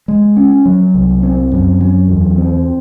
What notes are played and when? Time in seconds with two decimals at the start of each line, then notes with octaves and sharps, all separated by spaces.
0.08 G#3
0.37 C#4
0.66 F#3
0.94 C2
1.23 C4
1.52 F#2
1.80 F#3
2.08 E2
2.38 C4